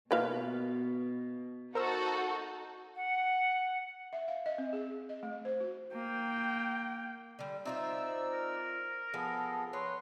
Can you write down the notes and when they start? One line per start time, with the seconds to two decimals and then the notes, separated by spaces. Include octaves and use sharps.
0.11 B2 D#3 A#3 F4 A4 B4 F5
1.75 D#4 F#4 A4 A#4 C5 E6
2.96 F#5
4.13 E5
4.28 F5
4.46 D#5
4.58 C4
4.73 G#4
5.09 D#5
5.23 A3
5.45 C5
5.60 F#4
5.93 A#3 G5
7.39 D3 G3
7.65 C4 D#4 F4 C5 D5 E5 E6
8.32 A#4
9.14 F3 B3 G#4 A4
9.73 B4 C#5 C6